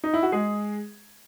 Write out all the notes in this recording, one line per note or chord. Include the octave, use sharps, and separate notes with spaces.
D#4
E4
F#4
G#3 G#4